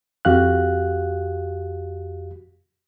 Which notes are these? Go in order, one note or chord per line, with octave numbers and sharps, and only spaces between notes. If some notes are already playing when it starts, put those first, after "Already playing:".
F2 F#4 G4 F5 F#6